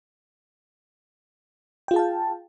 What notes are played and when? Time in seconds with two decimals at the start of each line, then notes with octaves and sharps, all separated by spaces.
1.88 G5
1.91 F4
1.94 G#4
1.96 A5
1.99 F5